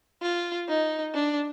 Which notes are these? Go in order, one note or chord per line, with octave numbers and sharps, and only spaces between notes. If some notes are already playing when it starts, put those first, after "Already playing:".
F4
D#4
D4